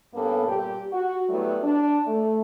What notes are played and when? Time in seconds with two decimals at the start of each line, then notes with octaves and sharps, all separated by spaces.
0.15 G2 A#3 B3 C#4 A4
0.47 A#2 G3 G4
0.92 F#4
1.29 F#3 G3 A3 B3 E4
1.63 D4
2.06 A3